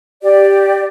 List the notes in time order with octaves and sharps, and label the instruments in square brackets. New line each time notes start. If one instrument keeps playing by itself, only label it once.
[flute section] G4 D5